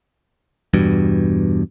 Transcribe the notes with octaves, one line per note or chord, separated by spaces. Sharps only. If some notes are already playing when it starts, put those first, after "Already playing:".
E2 G2 B2